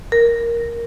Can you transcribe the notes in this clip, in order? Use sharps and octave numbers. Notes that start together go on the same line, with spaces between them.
A#4